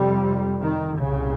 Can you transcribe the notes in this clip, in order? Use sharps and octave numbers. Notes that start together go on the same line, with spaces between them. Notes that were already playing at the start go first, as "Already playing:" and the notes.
Already playing: F2 C3 G3
D#3
C2 A#2 C#3